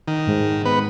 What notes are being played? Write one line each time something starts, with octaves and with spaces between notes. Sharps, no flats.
D#3
G#2
B3 B4